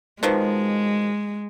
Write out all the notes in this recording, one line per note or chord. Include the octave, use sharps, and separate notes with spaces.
B2 D#3 F3 G#3